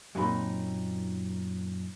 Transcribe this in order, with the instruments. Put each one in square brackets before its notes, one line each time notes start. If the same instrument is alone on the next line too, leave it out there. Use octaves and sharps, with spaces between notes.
[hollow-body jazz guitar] F#2 A#2 F#3 C4 D#4 B5